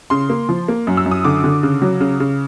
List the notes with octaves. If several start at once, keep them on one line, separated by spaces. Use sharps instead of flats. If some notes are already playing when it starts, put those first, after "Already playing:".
C#3 C6
A#3
F3
A#3
F#2
E6
F#2
D#6
D3 D6
D3
C#3
F#3
C#3
C#3